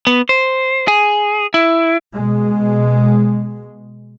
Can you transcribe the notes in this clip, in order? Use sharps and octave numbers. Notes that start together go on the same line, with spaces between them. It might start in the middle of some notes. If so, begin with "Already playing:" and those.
B3
C5
G#4
E4
B2 G#3